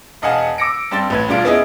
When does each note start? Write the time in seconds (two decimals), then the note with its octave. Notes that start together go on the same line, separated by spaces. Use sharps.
0.22 E1 D#5 F5 F#5 G#5 A5
0.58 D6 E6 A#6 C#7 D7
0.91 G2 G3 C4 C5 G5 A6
1.10 A1 B4 G#6
1.28 E1 G3 D4 F4 D7
1.45 B3 C#4 E4 G#4 D#5